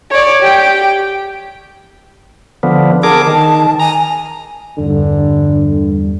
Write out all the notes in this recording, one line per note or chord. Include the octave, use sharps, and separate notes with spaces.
C#5 D5
G4 G5
D3 F3 B3
G#4 A#4 A5 D6
D#3
G#5 A#5
E2 G2 D3